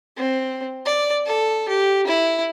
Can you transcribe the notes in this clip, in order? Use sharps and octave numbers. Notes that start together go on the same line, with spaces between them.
C4
D5
A4
G4
E4